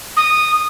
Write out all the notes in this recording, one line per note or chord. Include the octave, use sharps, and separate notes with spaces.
D#6